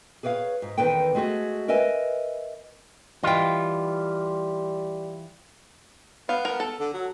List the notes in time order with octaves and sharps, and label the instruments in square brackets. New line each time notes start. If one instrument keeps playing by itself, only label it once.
[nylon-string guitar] G#4 B4 C#5 D5 F5
G#2
E2 D#3 A4 B4 C5 G5
G#3 A3 F#4 G#4
A#4 B4 D#5 E5 G#5
[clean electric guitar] E3 F4 [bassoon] G3 [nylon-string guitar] D#5 G5
[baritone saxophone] B3 [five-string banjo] F5
[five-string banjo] A#4
A4
[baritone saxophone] D3
F#3